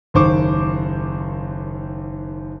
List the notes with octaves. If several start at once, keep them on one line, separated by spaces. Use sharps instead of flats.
F#1 D#2 D#3 C5 C#6 D6